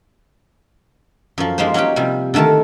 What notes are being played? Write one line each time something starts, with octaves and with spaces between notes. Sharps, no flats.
F#2 F3
F3 G#3 A#3 D#4 G4 C5
F#3 C#4 D#4 F#4 G4
C3 F3 G3
D3 D#3 A3 A#4 A5